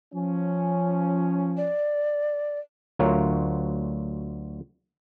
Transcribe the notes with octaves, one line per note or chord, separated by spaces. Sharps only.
F3 C#4
D5
D2 F#3 F4 A#4 C#5